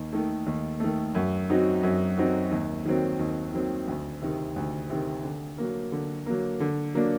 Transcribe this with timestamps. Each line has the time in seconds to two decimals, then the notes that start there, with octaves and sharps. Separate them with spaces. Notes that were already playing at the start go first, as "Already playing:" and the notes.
Already playing: D#2
0.13 D#3 A3
0.46 D#2
0.80 D#3 A3
1.15 F#2
1.49 F#3 C4 D#4 F#4
1.83 F#2
2.18 F#3 C4 D#4 F#4
2.51 D#2
2.85 D#3 F#3 C4
3.19 D#2
3.53 D#3 F#3 C4
3.87 D2
4.22 C3 D#3
4.56 D2
4.90 C3 D#3
5.24 D3
5.58 F#3 A#3
5.92 D3
6.26 F#3 A#3
6.60 D3
6.94 F#3 A#3 D4